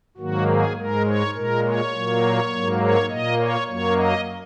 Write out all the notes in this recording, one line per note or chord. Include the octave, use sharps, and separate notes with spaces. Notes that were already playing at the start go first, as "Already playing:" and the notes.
G#2 D#3 F#3 A#3 F#4
G#4
G#2 G#3 A#4
C#5
A#2 G#3 A#4
C#5
A#2 F#3 A#3
G#2 F#3 A#3
C#5
A#2 A#3 D#5
C#5
F#2 F#3 A#3 C#5
D#5